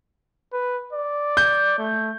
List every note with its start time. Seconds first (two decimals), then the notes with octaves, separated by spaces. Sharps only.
0.53 B4
0.93 D5
1.37 G6
1.78 A3